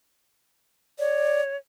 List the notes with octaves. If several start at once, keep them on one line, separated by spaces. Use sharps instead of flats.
C#5 D5